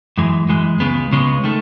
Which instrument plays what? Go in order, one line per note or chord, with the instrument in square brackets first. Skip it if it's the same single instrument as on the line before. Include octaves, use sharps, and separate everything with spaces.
[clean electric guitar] F#2 E3 G#3
F#2 E3 G#3
C#2 C#3 G#3 B3
C#2 C#3 G#3 B3
D#3 A3